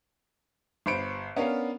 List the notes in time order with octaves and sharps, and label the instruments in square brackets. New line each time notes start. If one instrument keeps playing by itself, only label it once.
[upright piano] G1 C5 B5 C#7 D7
B3 C#4 D4 A#4 F5